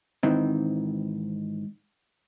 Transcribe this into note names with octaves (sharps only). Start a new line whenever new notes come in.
G#2 D#3 E3 C4